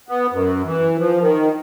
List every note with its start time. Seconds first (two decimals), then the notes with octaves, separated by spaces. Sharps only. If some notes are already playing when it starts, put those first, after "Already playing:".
0.09 B3
0.33 F#2
0.64 E3
0.98 F3
1.21 D#3